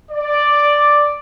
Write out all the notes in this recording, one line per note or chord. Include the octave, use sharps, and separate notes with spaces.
D5